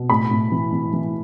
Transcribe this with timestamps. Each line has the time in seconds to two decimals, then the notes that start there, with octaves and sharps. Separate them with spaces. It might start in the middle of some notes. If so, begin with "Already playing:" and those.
Already playing: B2
0.10 A2 B5
0.31 A2
0.52 E3
0.72 E3
0.93 E3